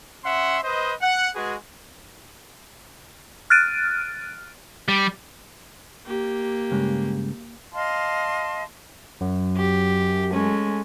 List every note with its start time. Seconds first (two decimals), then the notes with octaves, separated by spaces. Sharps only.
0.24 C#4 E5 F#5 C6
0.64 B4 C5 D#5
1.01 F#5
1.35 G#3 F#4 G#4 B4
3.50 F6 F#6 A6 D7 D#7
4.88 G3
6.07 A#3 G4
6.71 G2 C#3 G#3
7.73 D#5 F5 A5 C6
9.21 F#2
9.57 G4
10.32 G#3 A3 C#4